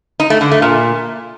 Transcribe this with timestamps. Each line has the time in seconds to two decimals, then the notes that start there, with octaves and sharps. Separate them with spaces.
0.20 D#4
0.30 A3
0.41 D3
0.51 A3
0.62 A#2